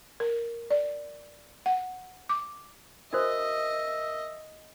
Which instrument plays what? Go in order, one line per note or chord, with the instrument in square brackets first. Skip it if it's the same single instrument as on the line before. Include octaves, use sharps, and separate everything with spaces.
[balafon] A#4
D5
F#5
D6
[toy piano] D4 F#4 C5 [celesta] A#4 D#6 [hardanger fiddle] D#5 [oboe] E5